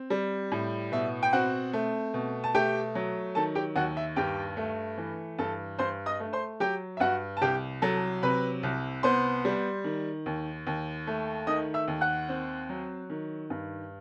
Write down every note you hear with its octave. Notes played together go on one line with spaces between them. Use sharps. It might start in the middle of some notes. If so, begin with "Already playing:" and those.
Already playing: C4
G3
A2
B2 E5
G5
C4 F#4 F#5
A3
B2
A5
A3 G4 G5
F#3
D#3 A4 A5
G4 G5
D#2 F#4 F#5
E5
G2 G4 G5
A3
E3
G2 A4 A5
G2 C5 C6
D#5 D#6
A3
C5 C6
F#3 G4 G5
E5
G2 F#4 F#5
A5
C2 G4 G5
F#3 A4 A5
C3 B4 B5
C2
B3 C5 C6
G3
D#3
D#2
D#2
A3
D#3 D#5 D#6
E5 E6
D#2
F#5 F#6
C4
F#3
D#3
G2